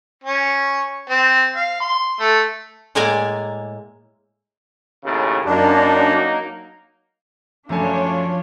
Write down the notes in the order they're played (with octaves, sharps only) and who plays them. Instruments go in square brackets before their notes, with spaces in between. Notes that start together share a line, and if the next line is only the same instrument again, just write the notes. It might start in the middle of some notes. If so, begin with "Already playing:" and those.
[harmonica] C#4
C4
F5
C6
A3
[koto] A2 G#3 A#3 D5 G#5 A#5
[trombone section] D#2 A2 C#3
[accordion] F#2 D4 [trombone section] F#3 A#3 D#4
[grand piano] F#2 A3 G#5 [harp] F3 [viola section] D4 F4 C#5